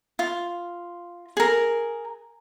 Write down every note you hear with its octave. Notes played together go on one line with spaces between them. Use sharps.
F4
G#4 A#4